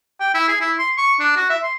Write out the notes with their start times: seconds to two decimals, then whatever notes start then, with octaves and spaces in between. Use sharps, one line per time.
0.20 G5
0.34 E4
0.48 G#4
0.60 E4
0.79 C6
0.97 C#6
1.20 D4
1.36 F#4
1.50 E5
1.63 C6